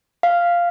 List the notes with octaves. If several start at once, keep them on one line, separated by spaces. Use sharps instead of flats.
F5